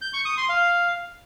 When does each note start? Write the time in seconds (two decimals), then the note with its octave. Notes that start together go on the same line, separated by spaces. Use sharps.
0.01 G6
0.13 C#6
0.25 D#6
0.37 C6
0.49 F5